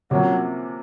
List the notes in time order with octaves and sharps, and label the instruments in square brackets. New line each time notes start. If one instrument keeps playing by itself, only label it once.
[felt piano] C3 F3 A#3 C#4 [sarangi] F#3